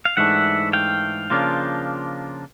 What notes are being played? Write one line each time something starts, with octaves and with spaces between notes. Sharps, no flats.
F5
G#2 E3 A3 D4 E5 F#5
F5 G5
C#3 F3 A#3 D4 F4